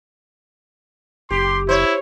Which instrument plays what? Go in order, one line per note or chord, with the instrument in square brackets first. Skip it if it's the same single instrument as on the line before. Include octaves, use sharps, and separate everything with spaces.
[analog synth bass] F#1 [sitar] G4 [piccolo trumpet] C6
[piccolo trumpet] E4 [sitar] C5 C#5